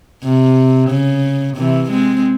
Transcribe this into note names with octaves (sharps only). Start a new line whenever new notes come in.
C3
C#3
C3 E3
G#3 C4